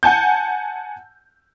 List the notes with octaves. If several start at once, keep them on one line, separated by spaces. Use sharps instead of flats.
F#5 G#5 A5 G6